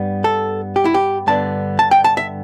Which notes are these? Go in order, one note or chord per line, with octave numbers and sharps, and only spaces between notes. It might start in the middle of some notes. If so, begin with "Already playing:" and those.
Already playing: G2 G3 B3
A4
G4
E4
G4
G2 D3 B3 D4 A5
A5
G5
A5
E5